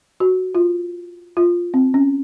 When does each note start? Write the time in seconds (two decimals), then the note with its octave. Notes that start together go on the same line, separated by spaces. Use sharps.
0.20 F#4
0.55 F4
1.37 F4
1.74 C4
1.94 C#4